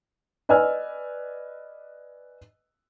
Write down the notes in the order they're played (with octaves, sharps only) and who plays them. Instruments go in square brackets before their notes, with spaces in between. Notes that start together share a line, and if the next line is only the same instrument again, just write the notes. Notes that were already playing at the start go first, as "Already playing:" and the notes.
[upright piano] B4 D5 D#5 G#5 E6 F6